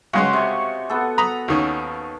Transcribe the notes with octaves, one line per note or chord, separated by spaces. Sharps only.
C#3 G#3 C#4 F#4 C6
C3 C#6
B3 A4
A#5 B5 D#6
D#2 D#3 C#4